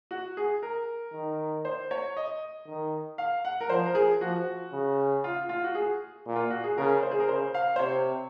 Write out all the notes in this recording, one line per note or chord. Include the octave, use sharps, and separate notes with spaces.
F#4
G#4
A#4
D#3
C5
C#5
D#5
D#3
F5
F#5
A#4
F3 C5
A#4
G#4
F3 F#4
C#3
F4
F4
F#4
G#4
A#2
F4
F#4
G#4
C#3 A#4
C5
G#4
A#4
C#3 C5
F5
C5
C3 C#5